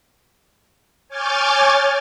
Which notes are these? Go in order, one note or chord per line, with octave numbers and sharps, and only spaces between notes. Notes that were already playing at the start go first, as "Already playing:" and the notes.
C#5 G#5 D6 F6 G6 A6